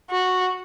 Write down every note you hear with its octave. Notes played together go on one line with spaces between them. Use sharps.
F#4